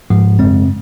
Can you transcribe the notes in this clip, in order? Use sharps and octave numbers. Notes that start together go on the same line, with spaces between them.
G#2 F3 G#3
F#2 C#3 G#3 C4